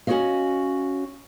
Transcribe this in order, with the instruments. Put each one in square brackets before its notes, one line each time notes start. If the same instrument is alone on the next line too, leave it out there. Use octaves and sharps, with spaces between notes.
[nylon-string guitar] C#4 F#4 A4 C#5 D#5 F5